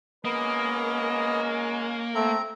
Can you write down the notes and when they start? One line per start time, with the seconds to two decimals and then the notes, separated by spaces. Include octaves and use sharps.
0.25 G#3 A#3 B3 C#4 A#4 D#5
2.15 A3 C4 A#5